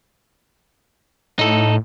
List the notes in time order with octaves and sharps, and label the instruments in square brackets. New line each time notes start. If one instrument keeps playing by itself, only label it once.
[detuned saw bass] A2 [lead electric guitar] D#4 A4